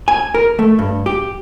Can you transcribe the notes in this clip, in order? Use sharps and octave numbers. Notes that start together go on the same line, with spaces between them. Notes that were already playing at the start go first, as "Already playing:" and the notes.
G#5
A#4
A3
G2
G4